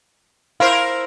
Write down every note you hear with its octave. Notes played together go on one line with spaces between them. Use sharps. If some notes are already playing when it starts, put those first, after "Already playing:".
E4 A#4 C5 F5